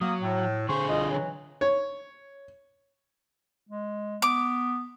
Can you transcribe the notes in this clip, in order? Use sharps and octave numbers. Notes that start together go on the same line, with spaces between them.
F#3 A#3 D#6
A2
D3 G#4 C5 C#6
C2 F4 D#5
E3 F#3
C#5
G#3
B3 D6